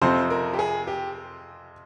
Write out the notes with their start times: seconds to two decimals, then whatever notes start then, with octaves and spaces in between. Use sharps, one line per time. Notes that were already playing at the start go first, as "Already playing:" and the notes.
0.02 F2 C3 F3 C5
0.30 A#4
0.53 G4
0.59 G#4
0.87 G4